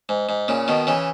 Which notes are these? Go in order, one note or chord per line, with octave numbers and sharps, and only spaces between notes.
G#2
G#2
A#2 C#3
B2 D#3
C#3 E3